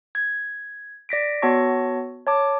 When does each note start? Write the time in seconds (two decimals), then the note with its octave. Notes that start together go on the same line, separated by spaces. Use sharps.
0.15 G#6
1.09 D5 A#6 B6 D7
1.42 B3 F#4 C#5 A5 C#6 A#6
2.27 C#5 A5 D6